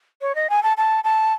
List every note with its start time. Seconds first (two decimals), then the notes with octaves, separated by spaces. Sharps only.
0.22 C#5
0.35 D#5
0.50 G#5
0.63 A5
0.77 A5
1.04 A5